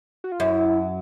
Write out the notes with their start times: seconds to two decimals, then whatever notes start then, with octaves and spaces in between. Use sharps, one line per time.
0.24 F#4
0.32 F4
0.40 F#2 E4